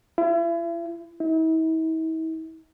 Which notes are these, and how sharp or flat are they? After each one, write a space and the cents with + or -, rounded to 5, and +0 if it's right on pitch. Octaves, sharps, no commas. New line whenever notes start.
E4 +40
E4 -45